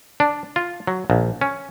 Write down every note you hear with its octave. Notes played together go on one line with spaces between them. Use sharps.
D4
F4
F#3
A#1
C#4